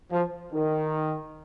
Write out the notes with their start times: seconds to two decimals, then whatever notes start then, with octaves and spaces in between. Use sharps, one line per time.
0.11 F3
0.52 D#3